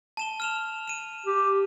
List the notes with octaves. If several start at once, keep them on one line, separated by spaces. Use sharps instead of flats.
A5 E7 G7
F6 E7 F7
D#7 E7
G4